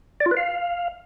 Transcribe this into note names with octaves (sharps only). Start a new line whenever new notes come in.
D5
F4
B4
F5